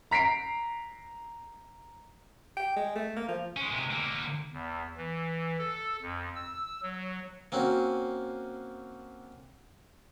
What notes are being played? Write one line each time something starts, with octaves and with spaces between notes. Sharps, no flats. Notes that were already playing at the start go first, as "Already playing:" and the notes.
A#5 B6 C7 D7
G5
G#3
A3
A#3
F3
G#3 C#4
C3 G#3
D3 A#3
E2
E3
A4
F2
E6
F#3
A#3 C4 C#4 F#4